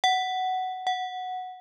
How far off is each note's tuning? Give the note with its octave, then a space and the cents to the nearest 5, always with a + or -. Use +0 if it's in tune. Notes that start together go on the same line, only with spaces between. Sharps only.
F#5 +10
F#5 -5